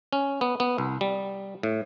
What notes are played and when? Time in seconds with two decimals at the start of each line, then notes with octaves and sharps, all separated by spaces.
0.13 C#4
0.41 B3
0.60 B3
0.78 C2
1.01 G3
1.63 A2